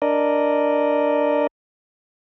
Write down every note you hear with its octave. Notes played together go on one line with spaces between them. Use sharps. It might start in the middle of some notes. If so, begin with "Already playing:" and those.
D4 A#4 D5 D#5